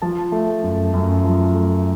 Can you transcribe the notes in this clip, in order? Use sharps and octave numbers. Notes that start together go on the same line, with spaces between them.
F3 A5
A3
F#2
F#2
F3
A3